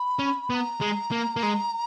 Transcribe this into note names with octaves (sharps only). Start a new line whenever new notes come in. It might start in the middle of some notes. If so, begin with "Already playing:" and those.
Already playing: B5
C#4
B3 B5
A#5
G#3
A#3
A#3
G#3